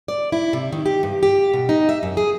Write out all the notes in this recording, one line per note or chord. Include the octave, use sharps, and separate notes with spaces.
D5
E4
C3
D#3
G4
G2
G4
B2
D#4
E5
F#2
G#4